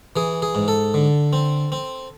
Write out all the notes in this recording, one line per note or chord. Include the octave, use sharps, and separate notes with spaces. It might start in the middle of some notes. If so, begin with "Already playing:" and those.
E3 G#4
G#4
G#2
A4
D3
C4
C4